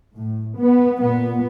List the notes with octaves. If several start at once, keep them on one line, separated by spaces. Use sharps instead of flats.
A2
B3
A#2 B3